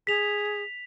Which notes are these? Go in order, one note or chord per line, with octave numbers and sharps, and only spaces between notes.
G#4 B6 F7